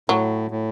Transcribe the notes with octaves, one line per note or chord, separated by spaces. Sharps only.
A2 F#3
A2